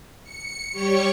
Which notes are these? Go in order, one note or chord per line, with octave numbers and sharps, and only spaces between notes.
C#7
G3 G4 C#5 C#6 C#7